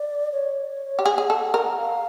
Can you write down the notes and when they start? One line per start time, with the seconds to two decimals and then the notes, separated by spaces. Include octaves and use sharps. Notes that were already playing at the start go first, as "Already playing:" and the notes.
Already playing: D5
0.32 C#5
0.99 G4
1.05 G#4 F#5
1.18 G#4
1.30 A4
1.54 A#4
1.78 F5